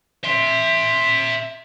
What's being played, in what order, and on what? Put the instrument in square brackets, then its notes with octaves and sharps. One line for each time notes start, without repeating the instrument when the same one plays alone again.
[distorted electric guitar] E5 C6